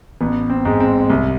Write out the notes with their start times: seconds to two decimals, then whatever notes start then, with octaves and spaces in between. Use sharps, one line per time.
0.21 A1 B3
0.50 C4
0.65 G#2 G#3
0.80 C4
1.10 C2